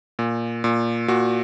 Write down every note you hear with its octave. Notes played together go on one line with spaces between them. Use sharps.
A#2
A#2
A#2 F#4